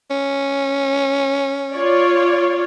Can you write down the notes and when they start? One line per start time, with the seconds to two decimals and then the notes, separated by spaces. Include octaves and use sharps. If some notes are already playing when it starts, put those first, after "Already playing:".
0.10 C#4
1.73 F4 C#5 D5